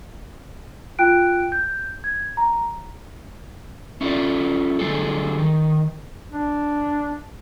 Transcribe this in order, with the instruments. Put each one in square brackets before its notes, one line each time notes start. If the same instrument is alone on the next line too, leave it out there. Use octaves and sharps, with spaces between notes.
[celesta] F4 G5 F#6 D7
G6
G#6
A#5
[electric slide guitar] C#4 E4 F4 A4 D5
D3 F#3 G3 G#4 A4
D#3
[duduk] D4